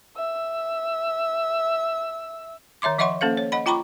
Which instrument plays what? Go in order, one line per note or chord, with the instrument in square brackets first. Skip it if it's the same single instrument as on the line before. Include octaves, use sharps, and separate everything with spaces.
[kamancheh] E5 E6
[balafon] D#3 C#5 E5 C6 D6
F3 D#5 E5 F#5 C6 C#6
A#3 C#4 A4 C5 F5
C#5
D#5 F#5 B5
F4 G5 A#5 B5 C#6 D6